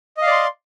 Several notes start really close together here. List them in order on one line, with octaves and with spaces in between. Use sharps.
D#5 F5 D5 C6